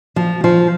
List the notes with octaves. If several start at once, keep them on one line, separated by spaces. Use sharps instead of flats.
F3
F3